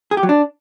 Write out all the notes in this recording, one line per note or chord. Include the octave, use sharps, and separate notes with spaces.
G#4
G4
F#3
D4